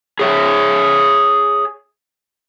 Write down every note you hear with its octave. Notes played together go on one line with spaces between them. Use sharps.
G#4 C#5 E5